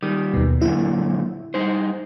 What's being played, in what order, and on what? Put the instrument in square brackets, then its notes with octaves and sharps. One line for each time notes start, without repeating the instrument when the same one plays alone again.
[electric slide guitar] D#3 G3 [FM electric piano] D#6
[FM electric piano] D#2 B2
[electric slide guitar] F#2 A#2 D3 [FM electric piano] E4
[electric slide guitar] G3 D#4 C5